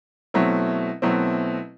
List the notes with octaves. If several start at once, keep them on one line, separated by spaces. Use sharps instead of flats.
B2 F#3 A3 C4 E4
B2 F#3 A3 C4 E4